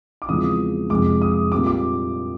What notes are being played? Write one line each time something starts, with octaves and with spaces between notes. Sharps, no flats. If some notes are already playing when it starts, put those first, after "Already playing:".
D6
E2 C#3 F3 G#3 C4 D#6
F2 C3 F3 G#3 D6
D#6
A#2 G3 C4 D6
D6